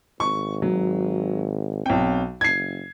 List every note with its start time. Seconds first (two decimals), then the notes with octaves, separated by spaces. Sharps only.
0.20 G#1 C#6
0.62 F#3
1.86 B1 C4 G5
2.41 F#1 G#6 C7